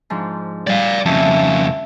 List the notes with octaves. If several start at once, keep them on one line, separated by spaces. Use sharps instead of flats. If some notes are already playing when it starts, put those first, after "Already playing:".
G#2 F3 D4
G3 D5 F5
F2 C#3 E5 A5